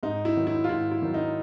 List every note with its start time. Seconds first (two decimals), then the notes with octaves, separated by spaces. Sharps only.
0.03 G#2 D#4
0.25 E4
0.37 D#3 F#3
0.47 E4
0.64 F4
0.69 G#2 E4
0.91 E4
1.02 D#3 F#3
1.14 D#4